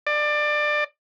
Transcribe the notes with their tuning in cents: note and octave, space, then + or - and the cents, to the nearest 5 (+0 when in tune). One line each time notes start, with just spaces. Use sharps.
D5 +20